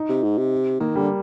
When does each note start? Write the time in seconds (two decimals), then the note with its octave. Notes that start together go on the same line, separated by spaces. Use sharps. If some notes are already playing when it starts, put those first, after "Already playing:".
Already playing: D#4
0.09 C3
0.23 G#2
0.37 C3
0.80 D#3 A#3
0.96 D3 G3